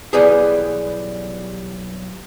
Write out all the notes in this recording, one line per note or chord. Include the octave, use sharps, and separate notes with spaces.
B1 E3 G3 B3 G#4